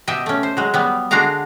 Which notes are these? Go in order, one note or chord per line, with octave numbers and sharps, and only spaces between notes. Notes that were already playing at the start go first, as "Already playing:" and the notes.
B2 G4 D#5 E5
A3 C#4
C5
F#3 G#3
F#3 G3 B3
D3 G#3 D4 F#4 F5 A#5